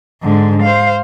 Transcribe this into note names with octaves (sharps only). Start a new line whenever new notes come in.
G#2 D3
C5 F5